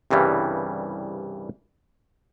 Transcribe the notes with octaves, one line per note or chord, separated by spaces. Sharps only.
C2 G2 C#3 E3 G3